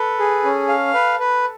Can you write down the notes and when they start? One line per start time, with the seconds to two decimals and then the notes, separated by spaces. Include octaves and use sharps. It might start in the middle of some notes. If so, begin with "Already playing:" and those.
Already playing: A4 B4
0.19 G#4
0.44 C#4
0.68 F5
0.94 B4
1.19 B4